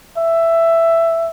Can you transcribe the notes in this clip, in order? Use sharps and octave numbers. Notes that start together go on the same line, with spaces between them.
E5